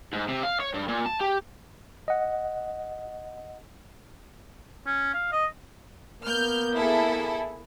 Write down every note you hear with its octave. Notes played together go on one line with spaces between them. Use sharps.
G#2
C3
F5
C#5
G2
A#2
A5
G4
D#5 F#5
C#4
F5
D#5
A#3 B3 F6 G6
E4 G#4 A4